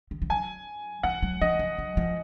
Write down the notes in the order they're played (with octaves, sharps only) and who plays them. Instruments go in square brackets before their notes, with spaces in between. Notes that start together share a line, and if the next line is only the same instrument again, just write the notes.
[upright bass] D#3
F3
[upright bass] F#3 [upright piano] G#5
[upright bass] F3 [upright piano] F#5
[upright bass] F#3
[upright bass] F3 [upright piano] D#5
[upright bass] F3
F#3
F3